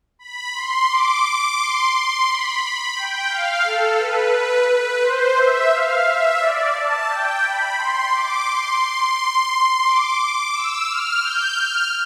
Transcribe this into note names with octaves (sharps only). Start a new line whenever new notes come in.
B5
C6
D6
C6
C6
B5
G5
F5
A4
B4
B4
B4
C5
E5
F5
E5
D5
A5
G5
B5
C6
D6
C6
D6
E6
F6
G6
F6